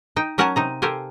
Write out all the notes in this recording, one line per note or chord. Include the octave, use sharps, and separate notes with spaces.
D#4 G5
F#3 C#4 A#4 F#5 G#5 A5
C3 D#4 A#5
G4 A4 A#4 C5 F5 G#5